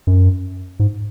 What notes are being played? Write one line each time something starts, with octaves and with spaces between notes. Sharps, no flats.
F#2
G#2